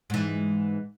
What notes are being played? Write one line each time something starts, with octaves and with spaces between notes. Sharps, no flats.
G#2 E3